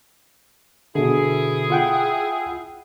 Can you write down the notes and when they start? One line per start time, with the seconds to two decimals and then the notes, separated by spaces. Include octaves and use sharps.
0.95 B2 D3 E4 G#4
1.70 F4 F#5 G5